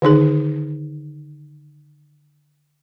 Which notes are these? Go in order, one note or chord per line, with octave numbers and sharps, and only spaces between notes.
D3 D#3 D#4 G#4